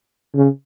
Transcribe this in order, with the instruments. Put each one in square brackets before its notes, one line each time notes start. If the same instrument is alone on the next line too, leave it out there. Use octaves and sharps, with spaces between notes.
[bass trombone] C#3